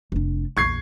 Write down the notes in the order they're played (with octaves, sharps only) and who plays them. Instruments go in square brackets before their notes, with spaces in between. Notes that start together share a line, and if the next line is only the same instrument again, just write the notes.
[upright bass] F1 D4
[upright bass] A#1 E2 [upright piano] C#6 G#6 C7